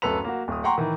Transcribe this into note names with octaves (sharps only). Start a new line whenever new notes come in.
D1 F#2 A4 B4 B5 F7
A#3 F#4
D1 D#6
F#5 G5 A#5 C6 C#6
A2 D#3 E3